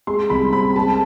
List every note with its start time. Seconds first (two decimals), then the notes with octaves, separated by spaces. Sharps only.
0.07 G#3 C6
0.30 C2 B5
0.52 C4 B5
0.76 G#3 A5